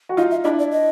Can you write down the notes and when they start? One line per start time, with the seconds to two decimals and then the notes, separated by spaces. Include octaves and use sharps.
0.09 F#4
0.17 D#4 F4 F5
0.31 E5
0.44 D4 E4 D#5
0.59 D5
0.72 D#5